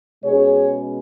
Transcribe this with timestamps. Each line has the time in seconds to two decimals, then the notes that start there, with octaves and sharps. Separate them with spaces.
0.23 B2 G#3 C#4 G#4 C#5